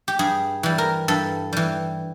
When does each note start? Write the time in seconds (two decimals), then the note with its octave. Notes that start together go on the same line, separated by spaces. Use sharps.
0.08 G4
0.19 G2 G#4
0.63 E3 G3
0.78 A#4
1.08 G2 A4
1.53 E3 G3